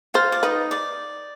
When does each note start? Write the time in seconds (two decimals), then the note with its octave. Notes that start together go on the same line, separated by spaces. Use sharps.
0.14 F4 C5 F5
0.32 D5
0.43 D#4 B4 D#5
0.71 D5